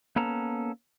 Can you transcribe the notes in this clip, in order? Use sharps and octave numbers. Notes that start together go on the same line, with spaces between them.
A#3 B3 C#4 A4 A#5